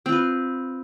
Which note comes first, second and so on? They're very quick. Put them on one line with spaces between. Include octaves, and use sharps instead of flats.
C4 F4 B4